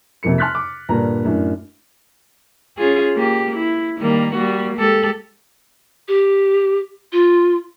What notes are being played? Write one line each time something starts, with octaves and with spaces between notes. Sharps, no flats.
F2 C3 F3 A#3 C#7
A5 C6 F6 F#6 A6 B6
D6
G2 A#2 D3 D4 A#5
F#2 A2 D4
C#4 F4 G#4
A#3 G4
E4
D#3 G3 A#3
G3 A#3 F#4
G#3 G4 A4
G4
F4